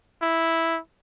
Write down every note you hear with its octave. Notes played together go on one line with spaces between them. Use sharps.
E4